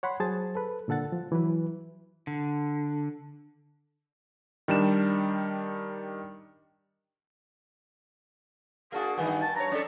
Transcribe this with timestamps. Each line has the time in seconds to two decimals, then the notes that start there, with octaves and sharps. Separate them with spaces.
0.03 C#5 F#5 B5 C6
0.20 F#3 G#4 C5 A5 A6
0.55 A4 B4
0.88 A#2 D3 A4 F#5 A6
1.12 F3
1.32 E3 F#3 B4
2.27 D3
4.68 D#3 G3 D4 E7
8.92 A#3 D4 F#4 G#4
9.18 G2 D#3 G3 B3 F#4 G#5
9.42 A5
9.56 G2 C#5 A#5
9.72 C#4 A4 D5